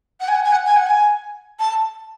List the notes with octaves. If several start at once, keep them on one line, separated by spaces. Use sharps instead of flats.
F#5
G#5
F#5
G#5
F#5
G#5
F#5
G#5
A5